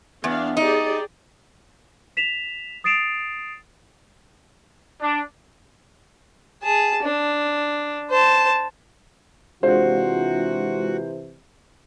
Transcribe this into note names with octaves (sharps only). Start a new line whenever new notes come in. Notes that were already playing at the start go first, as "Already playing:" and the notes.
E2 B3 D4 F5
D#4 G4 G#4 D5
B6 E7 F7
D#6 A6 C7 D7 E7 F7
D4
G#4 A5
D4
C5 A5
C3 E3 G#3 D4 F4 F#4 C5